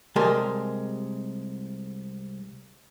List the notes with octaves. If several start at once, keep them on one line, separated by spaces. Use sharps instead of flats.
C2 G#3 G4 A#4 A5 C6